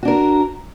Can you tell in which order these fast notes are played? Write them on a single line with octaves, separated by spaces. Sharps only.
F#4 D4 A#4